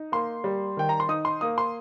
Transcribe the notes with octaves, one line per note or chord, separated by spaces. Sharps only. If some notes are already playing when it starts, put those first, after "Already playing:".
Already playing: D#4
A#3 C6
G3
D#3 G5
A#5
C6
D#4 D#6
C6
A#3 D#6
C6